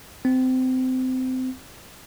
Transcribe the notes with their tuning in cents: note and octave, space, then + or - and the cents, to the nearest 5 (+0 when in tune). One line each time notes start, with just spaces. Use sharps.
C4 -25